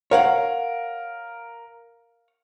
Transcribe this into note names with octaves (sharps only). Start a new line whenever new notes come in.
A#4 C#5 F5 F#5